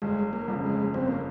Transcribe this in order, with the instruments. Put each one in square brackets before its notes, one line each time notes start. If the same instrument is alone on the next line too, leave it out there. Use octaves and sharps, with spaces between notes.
[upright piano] G1 [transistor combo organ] G#3
[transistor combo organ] A#3
[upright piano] F2 C#3
[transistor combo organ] G#3
[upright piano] G1 [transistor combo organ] C4
[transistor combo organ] A#3